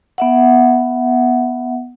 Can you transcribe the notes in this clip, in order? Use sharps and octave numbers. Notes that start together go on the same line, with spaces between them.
B3 E5 F#5